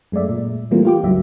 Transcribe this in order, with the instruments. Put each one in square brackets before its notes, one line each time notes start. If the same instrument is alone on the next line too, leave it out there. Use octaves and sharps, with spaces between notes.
[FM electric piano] F#2 G#3 A3 D5 E5
A#2
E3 G3 A3 A#3 C4 F4
F4 G4 D6
C#2 G2 F#3 E5